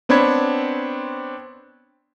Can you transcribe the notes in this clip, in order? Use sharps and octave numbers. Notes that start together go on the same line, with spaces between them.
B3 C4 D4 C#5 B5 G#6